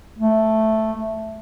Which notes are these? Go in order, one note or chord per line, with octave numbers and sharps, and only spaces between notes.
A3